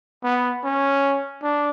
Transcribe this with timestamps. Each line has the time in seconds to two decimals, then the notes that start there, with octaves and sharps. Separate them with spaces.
0.23 B3
0.64 C#4
1.42 D4